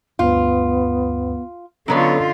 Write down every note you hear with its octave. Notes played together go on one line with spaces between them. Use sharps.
D2 G2 B3 F4
D3 F#3 B3 C#4 F4 A4 C#5 D#5